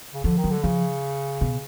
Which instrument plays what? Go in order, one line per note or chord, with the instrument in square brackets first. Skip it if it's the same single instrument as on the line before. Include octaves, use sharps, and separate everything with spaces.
[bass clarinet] C#3
[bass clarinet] D3 [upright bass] F3
[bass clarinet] D#3
[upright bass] F#3
[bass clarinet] D3
[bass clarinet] C#3 [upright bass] F3
[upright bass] B2